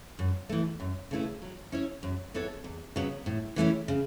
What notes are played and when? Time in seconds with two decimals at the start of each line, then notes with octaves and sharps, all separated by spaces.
0.19 F#2
0.49 E3 A3
0.80 F#2
1.11 C#3 A3 E4 B4
1.42 F#3
1.72 C#4 E4 C#5
2.03 F#2
2.34 E3 B3 A4 C#5
2.64 E2
2.96 C#3 F#3 B3
3.26 A2
3.56 E3 A3 C#4 E4
3.88 C#3